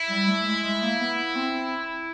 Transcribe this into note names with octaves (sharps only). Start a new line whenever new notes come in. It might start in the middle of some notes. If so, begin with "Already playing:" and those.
Already playing: E4
G3
A3
G#3
G#3
A#3
B3
C4